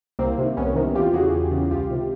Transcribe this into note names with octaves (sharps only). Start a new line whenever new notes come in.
C2 A#3 C4
C3 D#3
C2 B3 C#4
C3 D#3
E2 F4 G4
C#3 E3 F#4 G#4
E2
C#3 E3
C#2 F4 G4
C3 D#3